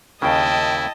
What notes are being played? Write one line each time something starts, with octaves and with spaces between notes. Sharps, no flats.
D#2 C#3 E4 D#5 G5 A5